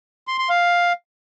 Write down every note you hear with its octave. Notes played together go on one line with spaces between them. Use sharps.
C6
C6
F5